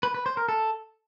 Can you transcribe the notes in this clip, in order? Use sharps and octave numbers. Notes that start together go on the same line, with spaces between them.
B4
B4
C5
A#4
A4